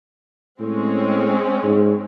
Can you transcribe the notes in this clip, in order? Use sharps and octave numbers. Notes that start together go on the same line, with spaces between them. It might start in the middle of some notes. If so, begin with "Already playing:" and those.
A2 G#3 C4 C#4
G#2